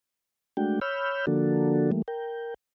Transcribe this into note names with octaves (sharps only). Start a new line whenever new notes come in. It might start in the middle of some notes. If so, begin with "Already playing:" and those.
G#3 A3 D4 F#4 G5
C#5 B5 E6 F6 G6
D3 F3 A#3 D4 F#4 A4
E3 G3 A3 A#3
A#4 G5